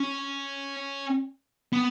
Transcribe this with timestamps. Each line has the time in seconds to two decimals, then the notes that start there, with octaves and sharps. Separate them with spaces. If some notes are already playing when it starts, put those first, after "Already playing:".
Already playing: C#4
1.73 B3